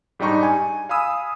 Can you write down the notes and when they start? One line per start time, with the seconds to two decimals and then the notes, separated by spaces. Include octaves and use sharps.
0.19 G#2 G3 D4 D#4 C#6
0.43 G#5
0.89 F5 G#5 B5 D#6 E6